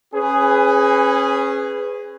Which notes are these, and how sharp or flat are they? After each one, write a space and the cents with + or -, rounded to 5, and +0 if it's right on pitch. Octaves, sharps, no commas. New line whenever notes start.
C#4 -25 G#4 +0 B4 +15